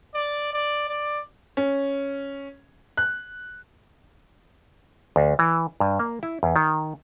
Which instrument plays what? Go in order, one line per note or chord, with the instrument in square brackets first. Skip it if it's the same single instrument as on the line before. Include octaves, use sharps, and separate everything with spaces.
[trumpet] D5
D5
D5
[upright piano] C#4
F#6
[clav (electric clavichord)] D2
E3
G2
A#3
E4
E2
D#3